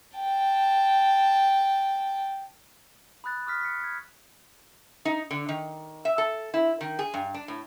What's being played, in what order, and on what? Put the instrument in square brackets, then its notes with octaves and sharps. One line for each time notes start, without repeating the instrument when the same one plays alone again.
[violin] G5 A5
[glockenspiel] B5 D#6 F#6 A6
C#6 D#6 F6 B6
B6 C#7
G#6
[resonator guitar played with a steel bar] D#4
D3
D#3
E5
A4
E4
D#3
G#4
G2
D4
A2